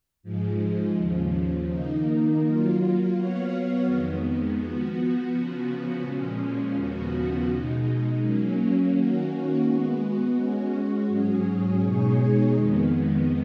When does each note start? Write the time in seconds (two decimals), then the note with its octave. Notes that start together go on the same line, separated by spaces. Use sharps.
0.23 G#2 F3 G#3
0.94 D#2 C#3 F3
1.67 D#3 A#3 D#4
2.40 F#3 A#3 F4
3.12 F#3 B3 F#4 C#5 F5
3.84 F2 D#3 G#3 B3
4.56 F3 B3 F#4
5.29 C#3 F3 B3 F#4
6.02 A#2 F3 G#3 C#4
6.73 D#2 C#3 F3 B3 F#4
7.45 B2 G#3 D#4
8.18 F#3 A#3 C#4
8.90 D#3 A#3 C#4 F#4
9.63 G#3 B3 F#4
10.35 G#3 C#4 F#4
11.07 G#2 F#3 C#4 G#4
11.79 B2 G#3 D#4 G#4 C#5
12.52 F2 D#3 G#3 B3